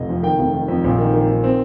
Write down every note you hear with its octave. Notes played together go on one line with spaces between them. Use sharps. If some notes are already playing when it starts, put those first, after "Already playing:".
Already playing: F1 D#5
F2
D#3 G5
F1
D#3
F2
A#1
D#3
D#3
D#3
C4